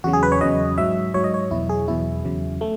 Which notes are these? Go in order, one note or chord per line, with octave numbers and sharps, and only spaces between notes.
E2 C#3 F#3 F#4
G#4
B4
C#5
E2 C#3 F#3 D#5
G#2 F#3 E5
G#2 F#3 C#5
D#5
C#5
E2 B2 F#3 E4
G#4
E2 B2 F#3 E4
E2 C#3 F#3
A3